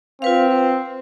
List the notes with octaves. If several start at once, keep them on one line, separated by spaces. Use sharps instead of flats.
C4 F4 B4 F5